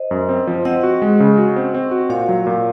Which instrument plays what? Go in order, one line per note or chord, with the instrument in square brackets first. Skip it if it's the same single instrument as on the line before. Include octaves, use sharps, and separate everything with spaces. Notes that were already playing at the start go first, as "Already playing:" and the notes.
Already playing: [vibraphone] C5 D#5
[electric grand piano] F#2
C4
F3
[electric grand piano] C4 [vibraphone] D#5 F#5
[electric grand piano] F#4
G#3
C#3
F#4
C4
C4
F#4
[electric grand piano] A#2 [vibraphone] C#5 F5
[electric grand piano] F#3
A#2